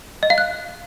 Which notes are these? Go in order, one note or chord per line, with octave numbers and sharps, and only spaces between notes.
D#5
F5
F#6